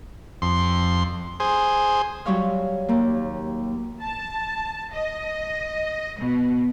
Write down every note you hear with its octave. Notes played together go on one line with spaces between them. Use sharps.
F2 C6
G#4 C5
F#3 G3 C#5 F5
D#2 A#3
A5
D#5
B2